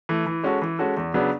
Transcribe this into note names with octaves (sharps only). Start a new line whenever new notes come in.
E3 A3
E3
G#3 C#4 F#4 A4
E3
G#3 C#4 F#4 A4
E2
C#3 F#3 B3 D4